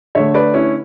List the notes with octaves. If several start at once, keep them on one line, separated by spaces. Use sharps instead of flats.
D3 A3 C#5 E5
B4 D5
C#4 E4